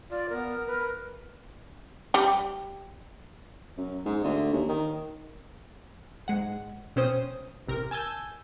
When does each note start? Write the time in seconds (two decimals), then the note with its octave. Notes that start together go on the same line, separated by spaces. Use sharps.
0.11 F4 D5
0.29 B3 A#4
0.67 B4
2.14 G3 G4
3.78 F#2
4.06 G#2
4.24 D2
4.53 D#2
4.69 D#3
6.28 G#2 G#3 F#5
6.96 B2 C4 C#4 C5 D#6
7.67 A1 C3 A#4
7.91 G#5 A5 E6 G6 G#6